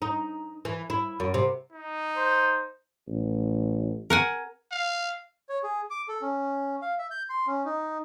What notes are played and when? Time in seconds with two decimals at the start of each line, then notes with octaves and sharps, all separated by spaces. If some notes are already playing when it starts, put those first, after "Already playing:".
0.02 D#4
0.65 E3
0.90 E4
1.20 F#2
1.34 C3
1.72 D#4
2.17 C5
3.08 A1
4.10 A#4 F#5 G#5
4.71 F5
5.49 C#5
5.63 G#4
5.90 D6
6.08 A4
6.22 C#4
6.82 F5
6.99 E5
7.11 G6
7.29 C6
7.47 C#4
7.65 D#4